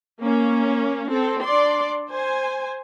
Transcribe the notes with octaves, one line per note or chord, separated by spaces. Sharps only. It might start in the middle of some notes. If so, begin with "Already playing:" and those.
A#3 C#4
C4 A4
D4 D5 C6
C5 G#5